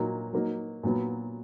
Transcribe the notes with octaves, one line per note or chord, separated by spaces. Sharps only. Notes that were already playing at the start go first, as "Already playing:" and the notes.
Already playing: A#2 F#3 A#3 D#4
F#3 A#3 D#4
A#2 F#3 B3